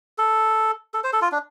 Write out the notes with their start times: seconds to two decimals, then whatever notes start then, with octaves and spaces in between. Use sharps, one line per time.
0.18 A4
0.94 A4
1.04 C5
1.13 A4
1.22 F4
1.32 D4